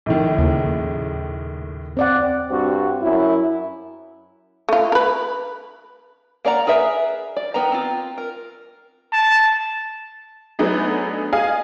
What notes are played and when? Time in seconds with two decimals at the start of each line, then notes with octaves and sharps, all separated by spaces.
0.06 A#1 A2 D#3
0.38 D#2 C#3
1.97 C4 D5 F#5
2.51 G2 C4 F#4
3.02 F#2 E4
4.69 A3 F4
4.92 A#4 B4
6.45 A#3 A#4 D5 F#5 A#5
6.67 G#4 A#4 B4 E5
7.36 D5
7.54 D#3 B3 G5 A#5
7.72 C4 F4
8.18 A#4
9.13 A5
10.59 F#3 A3 B3 D4 D#4 G#4
11.33 G#4 D#5 F5 G#5